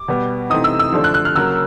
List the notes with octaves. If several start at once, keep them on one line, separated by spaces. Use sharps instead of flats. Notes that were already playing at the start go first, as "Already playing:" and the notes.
Already playing: D6
B2 G3 B3
C3 E3 A3 C4 D#4 D#6
E6
E6
D3 F3 A3 D4
F#6
F#6
F6
C#3 F#3 A#3 E6